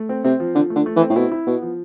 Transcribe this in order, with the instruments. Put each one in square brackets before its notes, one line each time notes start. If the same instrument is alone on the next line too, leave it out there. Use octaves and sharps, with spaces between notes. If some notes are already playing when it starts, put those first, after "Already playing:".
Already playing: [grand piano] A3
C4
[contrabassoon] C3 [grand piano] C4
[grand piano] F3
[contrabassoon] D3 [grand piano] F3
[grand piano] A3
[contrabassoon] D3
[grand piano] A3
[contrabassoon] E3
[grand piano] C4
[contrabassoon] A2
[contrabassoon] B2 [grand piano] E4
[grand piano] E4
[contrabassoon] B2 [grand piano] B3
[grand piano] F3